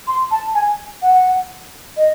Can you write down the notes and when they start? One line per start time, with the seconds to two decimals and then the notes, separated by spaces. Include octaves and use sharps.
0.07 C6
0.31 A5
0.55 G#5
1.02 F#5
1.97 D#5